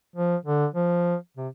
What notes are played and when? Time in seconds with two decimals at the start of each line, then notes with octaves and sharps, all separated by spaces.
0.16 F3
0.45 D3
0.74 F3
1.37 C3